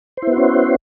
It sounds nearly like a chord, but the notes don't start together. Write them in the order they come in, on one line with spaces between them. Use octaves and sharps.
C5 E4 B3 F#4 C#4